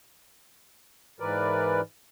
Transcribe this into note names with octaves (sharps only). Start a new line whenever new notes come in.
G#2 E3 A#4 B4 D5